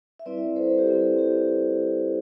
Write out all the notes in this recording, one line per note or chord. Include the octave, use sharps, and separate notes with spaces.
E5
G3 C4 E4 B4 D5
A4 C5
G4
G3 C4 E4 A4
G4